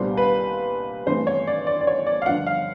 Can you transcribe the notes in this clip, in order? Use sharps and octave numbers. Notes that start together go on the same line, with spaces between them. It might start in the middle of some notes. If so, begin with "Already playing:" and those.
Already playing: C2 A#2 G3 B3 D4 C5
B4
G2 E3 A3 C4 C5
C#5
D5
D5
D5
C#5
D5
F5
G2 D3 F3 F#5
F5